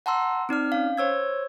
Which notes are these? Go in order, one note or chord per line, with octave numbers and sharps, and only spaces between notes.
F#5 A5 A#5 C6 E6
C4 D#4 D5 F6
C#4 F5
C5 C#5 E6 G#6